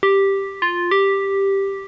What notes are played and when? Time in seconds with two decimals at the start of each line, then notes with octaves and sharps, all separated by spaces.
0.03 G4
0.62 F4
0.91 G4